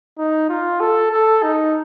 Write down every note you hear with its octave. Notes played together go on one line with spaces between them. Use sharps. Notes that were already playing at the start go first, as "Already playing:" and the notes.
D#4
F4
A4
A4
D#4